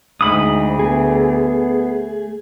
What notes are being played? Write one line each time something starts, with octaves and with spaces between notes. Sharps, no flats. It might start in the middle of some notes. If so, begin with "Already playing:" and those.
D2 G#2 B5 D#6
A3 B3 G#4